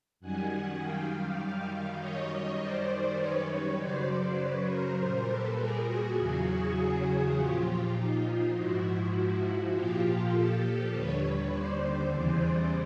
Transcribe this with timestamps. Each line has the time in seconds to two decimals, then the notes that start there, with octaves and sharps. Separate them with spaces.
0.20 F#2 D#3 G3 F#5 G#5
0.79 F5 G5
1.39 F#2 D#3 G3
1.99 C#5 D#5
2.58 F#2 D#3 G3 C5 D5
3.17 B4 C#5
3.77 F#2 C#3 F#3 C5 D5
4.07 C5 D5
4.37 B4 C#5
4.67 A#4 C5
4.96 A#2 G3 A#4 C5
5.26 A4 B4
5.56 G#4 A#4
5.86 F#4 G#4
6.16 E2 C#3 F#3
7.35 A#2 F3 F4 G4
7.94 D#4 F4
8.54 G#2 F3 E4 F#4
9.73 A#2 F3 F4 G4
10.32 G4 A4
10.92 D#2 D3 G3 B4 C#5
11.21 B4 C#5
11.51 C5 D5
12.10 E2 C#3 E3 G3 C5 D5